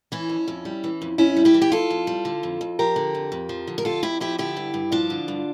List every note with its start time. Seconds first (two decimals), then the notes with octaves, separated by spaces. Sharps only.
0.12 E3 C#4 E4
0.29 F2
0.48 F2
0.65 G3
0.84 E3
1.02 F2
1.18 F2 C#4 E4
1.36 G3
1.45 E4 G4
1.54 E3
1.62 G4
1.72 F2 F4 A4
1.90 F2
2.07 G3
2.25 D3
2.43 F2
2.61 F2
2.79 F3 G4 A#4
2.96 D3
3.15 F2
3.32 F2
3.49 F3
3.68 D3
3.78 A#4
3.85 F2 F4 A4
4.03 F2 E4 G4
4.20 F3 E4 G4
4.38 D3 E4 G4
4.57 G2
4.74 G2
4.92 F3 D4 F4
5.10 D3
5.28 G2